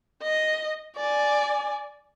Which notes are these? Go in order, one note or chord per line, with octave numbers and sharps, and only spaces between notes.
D#5
D5 G#5